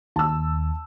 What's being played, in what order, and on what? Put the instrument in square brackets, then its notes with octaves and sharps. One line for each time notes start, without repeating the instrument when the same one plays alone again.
[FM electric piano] D#2 [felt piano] A5 E6